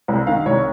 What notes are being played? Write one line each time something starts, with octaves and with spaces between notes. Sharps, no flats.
C2
D#3 F5
C2 C#5